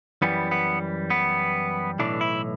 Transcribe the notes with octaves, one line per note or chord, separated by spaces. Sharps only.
F#2 E3 G3 B3
B3
B3
B1 A2 E3 D4
E4